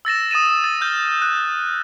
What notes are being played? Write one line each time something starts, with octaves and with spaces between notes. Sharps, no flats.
E6 A6 A#6 E7
D#6 A6 D#7 E7
A6
F6 G6
F#6